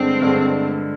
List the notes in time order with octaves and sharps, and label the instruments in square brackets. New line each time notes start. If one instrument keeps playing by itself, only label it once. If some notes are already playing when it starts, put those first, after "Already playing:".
Already playing: [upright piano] G2 D3 G#3 D4 [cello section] C4
[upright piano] G2 D3 G#3 D4